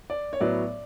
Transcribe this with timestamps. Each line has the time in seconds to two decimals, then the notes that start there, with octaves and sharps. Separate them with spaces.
0.10 D5
0.33 C#5
0.40 A2 F#3 B3 D5